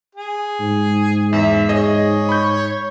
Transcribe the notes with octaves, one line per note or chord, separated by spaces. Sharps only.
G#4
G#2
E2 E5
G#4 C#5 D#5
B5 C#6 G6